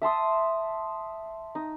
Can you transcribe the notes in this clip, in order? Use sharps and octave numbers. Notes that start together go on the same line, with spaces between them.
E5 A5 C6 D#6
D#4